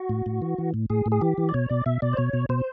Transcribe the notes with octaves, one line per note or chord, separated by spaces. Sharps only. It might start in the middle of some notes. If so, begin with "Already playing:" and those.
Already playing: F#4
A2
A2
E3
E3
A2
A2 G#4
A2
G#4
E3 G4
E3
D5
B2 C#5
B2 D5
B2 E5
B2 D5
C5
B2 C#5
B2
B2 C5